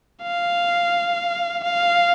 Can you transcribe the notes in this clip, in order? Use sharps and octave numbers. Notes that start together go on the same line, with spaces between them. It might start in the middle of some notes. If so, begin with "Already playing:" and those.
F5
F5